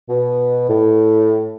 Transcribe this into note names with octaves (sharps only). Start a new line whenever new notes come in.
B2
A2